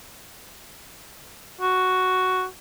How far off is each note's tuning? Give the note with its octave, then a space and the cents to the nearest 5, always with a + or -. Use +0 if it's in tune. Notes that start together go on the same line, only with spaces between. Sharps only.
F#4 +5